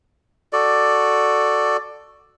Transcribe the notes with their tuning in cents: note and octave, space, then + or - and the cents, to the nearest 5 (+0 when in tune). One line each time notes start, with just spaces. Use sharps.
F#4 +0 A4 +0 D5 +10